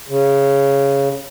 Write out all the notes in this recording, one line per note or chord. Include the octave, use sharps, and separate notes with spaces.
C#3